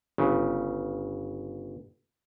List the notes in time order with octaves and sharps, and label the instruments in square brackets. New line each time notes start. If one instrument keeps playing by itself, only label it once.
[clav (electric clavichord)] G1 C#3